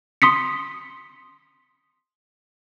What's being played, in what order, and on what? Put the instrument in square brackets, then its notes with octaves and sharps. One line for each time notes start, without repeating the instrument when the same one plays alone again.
[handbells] C6 D#6 B6 C#7